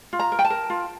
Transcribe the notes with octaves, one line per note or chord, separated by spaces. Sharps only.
F4
A#5
A#4
G5
A5
A#4
F4